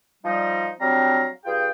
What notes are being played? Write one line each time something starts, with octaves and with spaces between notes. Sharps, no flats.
F3 G3 D#4
F#3 G3 C4 D4 F5 A#5
G2 F4 G#4 G5